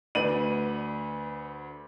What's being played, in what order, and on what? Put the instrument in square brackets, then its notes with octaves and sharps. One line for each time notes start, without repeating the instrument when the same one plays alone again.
[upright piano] D2 B4 D5 D#7 F#7